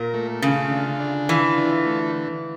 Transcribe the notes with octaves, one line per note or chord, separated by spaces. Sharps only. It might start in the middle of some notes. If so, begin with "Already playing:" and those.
Already playing: A#2 A#4
A3
C#3 F4
D3
D4
E3 F4
D3
A3